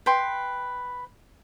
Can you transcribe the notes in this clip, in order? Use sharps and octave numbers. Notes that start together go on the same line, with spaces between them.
B4 G5 C6